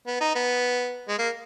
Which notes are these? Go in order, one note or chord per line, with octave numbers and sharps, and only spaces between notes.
B3
D#4
B3
G#3
A#3